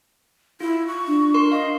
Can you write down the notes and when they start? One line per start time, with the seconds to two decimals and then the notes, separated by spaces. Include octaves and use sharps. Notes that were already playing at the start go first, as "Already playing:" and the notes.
0.61 E4 F4
0.87 C#6
1.07 D4
1.34 A#4 C6
1.52 D#5 F5